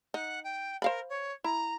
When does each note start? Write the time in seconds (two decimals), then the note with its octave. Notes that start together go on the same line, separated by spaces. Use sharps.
0.14 D#4 F#5
0.44 G5
0.82 A#4 C5 F5 B5
1.09 C#5
1.44 E4 A#5